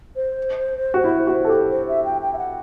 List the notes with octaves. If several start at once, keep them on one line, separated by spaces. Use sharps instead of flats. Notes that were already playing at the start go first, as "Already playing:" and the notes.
C5
F#4
E4
F#4
A4
G4
C5
E5
G5
G5
E5
F#5